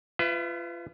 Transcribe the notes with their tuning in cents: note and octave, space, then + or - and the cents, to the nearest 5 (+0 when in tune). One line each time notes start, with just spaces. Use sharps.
F4 -25 B4 +25 E5 +0